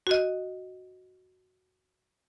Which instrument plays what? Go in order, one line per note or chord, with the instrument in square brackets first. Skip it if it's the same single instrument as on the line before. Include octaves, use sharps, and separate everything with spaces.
[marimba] F#4 D#5